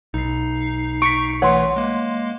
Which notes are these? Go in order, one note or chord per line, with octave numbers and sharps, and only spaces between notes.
B1 D#4 C7
C#6 B6 C#7 D7
E3 A3 B4 C#5 F#5 C6
G#3 A#3